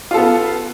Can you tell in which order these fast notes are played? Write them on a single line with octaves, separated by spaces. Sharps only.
F4 A4 B3